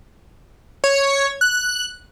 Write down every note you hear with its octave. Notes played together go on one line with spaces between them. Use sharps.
C#5
F#6